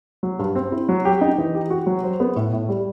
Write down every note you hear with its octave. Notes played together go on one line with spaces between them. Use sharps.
F#3
G2
C4
E4
F#3
G4
D#4
E3
G4
F#4
F#3
C5
B3
A2
A2
G3